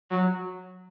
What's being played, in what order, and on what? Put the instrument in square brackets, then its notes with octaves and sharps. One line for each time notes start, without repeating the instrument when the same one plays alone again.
[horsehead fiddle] F#3